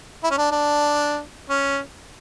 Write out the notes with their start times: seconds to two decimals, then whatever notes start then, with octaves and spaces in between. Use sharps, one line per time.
0.24 E4
0.31 C#4
0.37 D4
0.51 D4
1.50 C#4